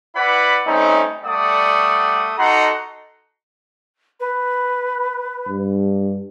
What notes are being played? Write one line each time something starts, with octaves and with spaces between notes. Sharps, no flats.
E4 B4 D5 F#5 B5
G3 A3 C4 C#4 D#4
G3 A3 D5 F#5 D#6
D#4 F#4 A4 F#5 A#5 C6
B4
G2